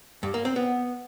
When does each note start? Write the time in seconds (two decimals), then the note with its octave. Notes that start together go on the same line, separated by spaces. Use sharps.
0.23 G2
0.34 A#3
0.45 C4
0.56 B3